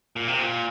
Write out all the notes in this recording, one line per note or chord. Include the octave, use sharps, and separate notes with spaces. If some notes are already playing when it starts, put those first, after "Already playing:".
A#2
C3
A#2